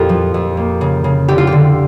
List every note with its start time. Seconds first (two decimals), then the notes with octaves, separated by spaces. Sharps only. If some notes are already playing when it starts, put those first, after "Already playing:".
Already playing: F2 A#2 F4 G4 A4
0.09 F3
0.34 F2
0.57 A#3
0.81 C#3
1.04 C#3
1.28 D3 G4
1.38 F4
1.47 G4
1.52 D3